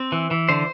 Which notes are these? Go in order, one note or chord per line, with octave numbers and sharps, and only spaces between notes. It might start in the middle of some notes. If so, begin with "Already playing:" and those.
Already playing: C4
E3
E3
D3 C5